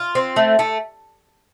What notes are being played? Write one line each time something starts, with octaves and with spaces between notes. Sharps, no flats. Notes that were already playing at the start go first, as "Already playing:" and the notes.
Already playing: F4
C4
A3
A3